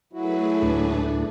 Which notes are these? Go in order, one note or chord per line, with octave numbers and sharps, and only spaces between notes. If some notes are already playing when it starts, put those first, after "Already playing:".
F#3 A3 E4 F#4 G#4 B4
D2 A2 D4